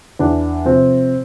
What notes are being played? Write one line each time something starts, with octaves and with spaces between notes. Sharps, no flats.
E2 D4
C3 F3 C4